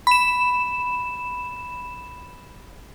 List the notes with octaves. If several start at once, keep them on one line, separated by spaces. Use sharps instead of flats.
B5 E7